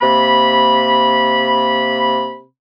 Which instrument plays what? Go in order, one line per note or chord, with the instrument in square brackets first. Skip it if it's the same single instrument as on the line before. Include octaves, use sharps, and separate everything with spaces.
[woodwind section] C3 A#3 B5